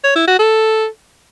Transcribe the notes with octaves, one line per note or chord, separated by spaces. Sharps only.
C#5
E4
F#4
A4